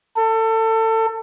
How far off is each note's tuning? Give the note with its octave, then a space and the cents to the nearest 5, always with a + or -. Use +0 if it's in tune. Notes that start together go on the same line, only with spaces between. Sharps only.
A4 +25